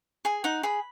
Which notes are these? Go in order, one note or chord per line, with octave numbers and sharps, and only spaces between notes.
G#4 G#5
D#4 F#5
G#4 B5